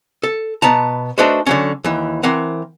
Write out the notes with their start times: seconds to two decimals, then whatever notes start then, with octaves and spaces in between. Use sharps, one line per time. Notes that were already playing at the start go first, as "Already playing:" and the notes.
0.23 A4
0.62 B2 B3 A5 A#5
1.18 A3 D4 D#4 F#4 B4 C5
1.46 D3 F#3 C#4
1.84 D#2 E3
2.23 E3 C4 A#4 F#5